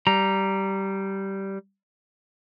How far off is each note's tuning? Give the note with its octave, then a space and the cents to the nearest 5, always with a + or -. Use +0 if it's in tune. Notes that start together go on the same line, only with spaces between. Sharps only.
G3 -10 A#5 +0